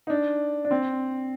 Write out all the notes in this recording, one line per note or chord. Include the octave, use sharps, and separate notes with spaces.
D#4
D4
D4
C4